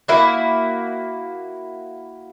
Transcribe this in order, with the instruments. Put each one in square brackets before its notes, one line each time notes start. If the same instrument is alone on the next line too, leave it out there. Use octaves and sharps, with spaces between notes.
[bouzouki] A#3 E4 F#4